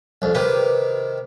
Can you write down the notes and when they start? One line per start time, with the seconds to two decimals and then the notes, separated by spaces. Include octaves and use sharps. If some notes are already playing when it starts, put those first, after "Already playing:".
0.22 C2 F2
0.34 C3 D#3 G4 B4